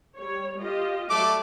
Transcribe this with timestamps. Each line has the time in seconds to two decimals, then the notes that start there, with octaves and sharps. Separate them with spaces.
0.17 G3 C#5
0.59 F4 G4 D#5
1.10 F#3 A3 F#4 D5 D6